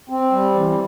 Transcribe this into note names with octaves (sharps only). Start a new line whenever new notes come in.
C4
G3
E3